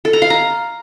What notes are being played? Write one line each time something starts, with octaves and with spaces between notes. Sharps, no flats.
A4
A#5
F5
A#5